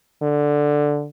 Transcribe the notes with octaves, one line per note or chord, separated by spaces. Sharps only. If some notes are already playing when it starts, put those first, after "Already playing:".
D3